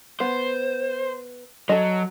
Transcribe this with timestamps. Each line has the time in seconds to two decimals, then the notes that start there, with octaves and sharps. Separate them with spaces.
0.20 B3 C5
1.69 F#3 A4 D#5